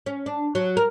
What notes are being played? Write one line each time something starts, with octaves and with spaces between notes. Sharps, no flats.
C#4
D4
F#3
A#4